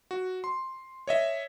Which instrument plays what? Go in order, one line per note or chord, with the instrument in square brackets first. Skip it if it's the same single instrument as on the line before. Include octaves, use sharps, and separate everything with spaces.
[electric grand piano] F#4
C6
C#5 D#5 E5